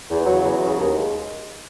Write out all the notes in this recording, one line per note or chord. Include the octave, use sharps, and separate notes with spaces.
E2
C#3 F#3
E2
C#3 F#3
D#2
G#3